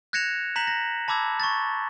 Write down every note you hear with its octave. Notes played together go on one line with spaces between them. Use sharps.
F#6 G#6 A#6 C#7 E7 F7
A#5 G6 B6 E7 F#7
A#6
A5 B5 D6 E6 G#6
C#6 A6